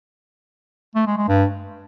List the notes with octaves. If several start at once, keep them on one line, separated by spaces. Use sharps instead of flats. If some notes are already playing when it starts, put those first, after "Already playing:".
A3
G#3
G#3
G2